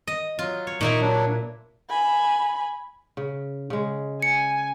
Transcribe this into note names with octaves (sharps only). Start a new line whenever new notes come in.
D#5
F#3 F4
C#5
A#2 A#3 D#4 E4 C#6
F#3 D4
G#5 B5
C#3
C#3 G#3
G#5 C#7